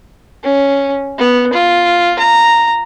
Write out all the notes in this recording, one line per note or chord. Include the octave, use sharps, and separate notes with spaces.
C#4
B3
F4
A#5